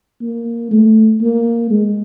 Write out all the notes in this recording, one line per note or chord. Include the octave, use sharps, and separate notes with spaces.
A#3
A3
A#3
G#3